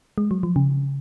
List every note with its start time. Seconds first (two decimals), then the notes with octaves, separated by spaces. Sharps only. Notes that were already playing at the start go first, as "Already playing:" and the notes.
0.18 G#3
0.31 F#3
0.43 F3
0.56 C#3